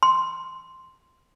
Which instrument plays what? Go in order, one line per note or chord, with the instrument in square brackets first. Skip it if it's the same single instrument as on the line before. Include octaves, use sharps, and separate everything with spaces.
[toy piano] C6